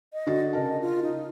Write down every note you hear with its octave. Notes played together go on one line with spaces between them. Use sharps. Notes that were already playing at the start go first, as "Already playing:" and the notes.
D#5
D3 F#4 A6
C#3 A#4 D#5 A5
F4
D#4